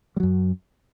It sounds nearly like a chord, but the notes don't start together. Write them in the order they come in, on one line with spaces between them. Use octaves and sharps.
G3 F#3 F#2